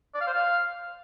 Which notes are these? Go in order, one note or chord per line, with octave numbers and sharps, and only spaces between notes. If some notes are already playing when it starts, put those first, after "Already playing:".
D5
F5
C5
F5